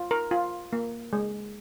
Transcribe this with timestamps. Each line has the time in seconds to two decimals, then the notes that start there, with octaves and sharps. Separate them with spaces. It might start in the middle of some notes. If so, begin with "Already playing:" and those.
Already playing: F4
0.11 A#4
0.31 F4
0.73 A#3
1.13 G#3